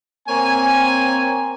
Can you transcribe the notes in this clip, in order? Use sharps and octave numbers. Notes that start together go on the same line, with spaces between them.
A#3 C4 C#5 G#5